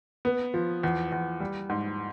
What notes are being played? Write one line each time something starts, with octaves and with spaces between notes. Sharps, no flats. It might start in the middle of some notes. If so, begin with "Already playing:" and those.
B3
F3
E2
E2
G3
G#2